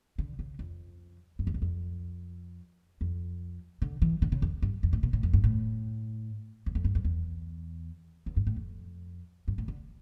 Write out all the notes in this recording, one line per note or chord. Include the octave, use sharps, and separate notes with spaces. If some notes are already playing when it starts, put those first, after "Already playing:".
D3
C#3
F2
G2
F2
E2
F2
F2
D3
E3
D3
C#3
F2
G2
F2
A2
A#2
A2
F2
G2
A2
E2
F2
G2
F2
E2
E2
G2
A2
F2
G2
A2
D3